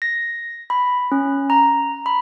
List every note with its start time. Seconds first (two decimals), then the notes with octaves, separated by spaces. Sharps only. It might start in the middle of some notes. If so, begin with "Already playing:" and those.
0.02 A#6
0.70 B5
1.12 C#4
1.50 A#5
2.06 B5